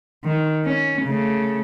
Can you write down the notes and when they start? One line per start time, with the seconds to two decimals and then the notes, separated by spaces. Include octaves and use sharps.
0.24 D#3
0.64 C#4
1.03 C#3 A3